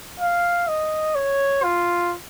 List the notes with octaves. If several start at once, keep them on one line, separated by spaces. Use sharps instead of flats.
F5
D#5
C#5
F4